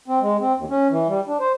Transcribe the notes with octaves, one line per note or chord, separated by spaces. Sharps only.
C4
G#3
C4
D#2
C#4
E3
G3
D4
C5